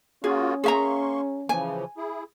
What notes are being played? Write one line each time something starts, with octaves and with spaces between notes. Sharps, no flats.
A#3 C#4 F4 F#4 G#4
A#3 G#4 E5 A#5 C6 C#6
C#3 E3 F3 G#5
E4 G#4